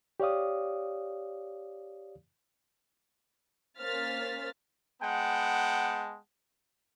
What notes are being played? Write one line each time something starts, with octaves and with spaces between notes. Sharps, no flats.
G4 C#5 D5 F5 D#6
A#3 C#4 C5 F6 A6 B6
G#3 B3 F#5 G5 A5